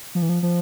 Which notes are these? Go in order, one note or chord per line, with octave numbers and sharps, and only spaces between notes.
F3
E3
F3
F3